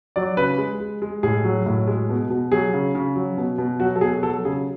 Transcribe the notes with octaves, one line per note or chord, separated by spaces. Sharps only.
F#3 D5
C#3 B4
G#3
G#3
G#3
A2 G#4
F#3
A2
G#3
B2
B2
F#3 G#4
C#3
C#3
F#3
B2
B2
F#3 F#4
A4
B2 G#4
F#3 A4
C#3 G#4